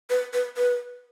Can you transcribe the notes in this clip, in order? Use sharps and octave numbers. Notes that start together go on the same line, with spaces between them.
B4
B4
B4